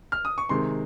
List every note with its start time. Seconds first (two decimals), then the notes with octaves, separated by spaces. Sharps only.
0.12 F6
0.25 D#6
0.38 C#6
0.49 C3 D#3 G#3 C6